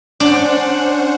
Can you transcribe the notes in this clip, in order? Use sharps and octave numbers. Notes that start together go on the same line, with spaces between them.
C#4 D4 C5 F#5